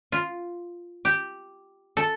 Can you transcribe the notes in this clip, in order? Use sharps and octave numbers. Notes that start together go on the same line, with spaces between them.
F4
G4
A4